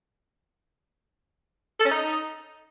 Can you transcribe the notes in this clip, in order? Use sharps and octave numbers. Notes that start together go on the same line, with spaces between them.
A4
C#4
D#4